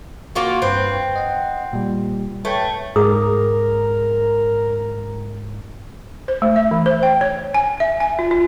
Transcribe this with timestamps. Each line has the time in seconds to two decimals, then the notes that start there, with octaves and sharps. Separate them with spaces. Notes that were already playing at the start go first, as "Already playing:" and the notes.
0.35 A#3 F4 F#4
0.62 G2 C4 B4 C6
1.16 D#5 F#5
1.73 A#2 G3
2.45 A3 B4 C#5 G5
2.96 G#2 G#4 A#4 A#5 D#6
6.28 C5
6.42 A3
6.56 E5
6.71 E3
6.86 C5
7.03 G5
7.21 C#5
7.54 G#5
7.80 E5
8.00 G#5
8.19 F4
8.31 F4